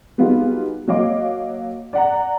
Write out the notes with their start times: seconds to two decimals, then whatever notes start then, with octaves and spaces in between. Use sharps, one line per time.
0.18 F#3 G3 B3 D#4 F4 G#4
0.87 F#3 A#3 C#5 D#5 F5 D6
1.93 D5 F#5 A#5